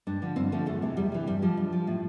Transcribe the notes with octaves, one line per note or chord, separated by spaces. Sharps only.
G2 D4
D3 F3
G2 C4
D3 F3 A3
E2 A3
C3 E3
E2 G3
C3 E3
G2 G3
F3 G3
G2
F3
A2